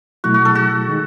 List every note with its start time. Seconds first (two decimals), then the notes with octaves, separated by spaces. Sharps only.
0.24 B2 F#3 A3 E4 F#4
0.34 F#4
0.45 A4
0.55 F#4
0.88 D#3 G#3 D#4 G#4